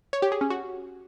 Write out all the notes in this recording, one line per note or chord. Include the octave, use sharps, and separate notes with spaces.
C#5
G4
G#4
C#4
F#4